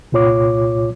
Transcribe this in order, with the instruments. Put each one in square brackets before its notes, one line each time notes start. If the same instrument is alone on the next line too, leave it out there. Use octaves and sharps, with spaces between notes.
[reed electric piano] C2 A#2 F4 C#5 D6